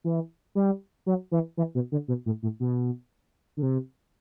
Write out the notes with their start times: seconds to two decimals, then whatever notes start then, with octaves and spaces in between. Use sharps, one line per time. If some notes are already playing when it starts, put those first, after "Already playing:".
0.04 E3
0.55 G3
1.06 F#3
1.31 E3
1.57 E3
1.75 B2
1.92 D3
2.08 B2
2.26 A2
2.43 A2
2.60 B2
3.57 D3
3.62 C3